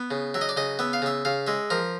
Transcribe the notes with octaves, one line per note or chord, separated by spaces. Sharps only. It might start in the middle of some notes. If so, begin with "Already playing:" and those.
Already playing: B3
C#3
F#3 E5
D#5
D5
C#3 D#5
B3 E5
F5
C#3 E5
C#3 F5
G#3 E5
F3 A#4